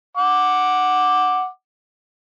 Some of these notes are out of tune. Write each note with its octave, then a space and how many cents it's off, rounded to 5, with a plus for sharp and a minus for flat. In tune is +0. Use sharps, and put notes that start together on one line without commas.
F#5 +0 D6 +0